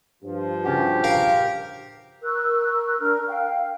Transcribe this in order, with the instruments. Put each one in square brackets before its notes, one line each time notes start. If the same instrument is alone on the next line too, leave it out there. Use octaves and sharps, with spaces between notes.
[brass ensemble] G2 F3
[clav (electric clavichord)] C#3 C#4 F#4 [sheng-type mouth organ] G4
[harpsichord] A#4 F5
[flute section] A#4 C#6 E6 F#6
D4 A#4 F6
F5 G5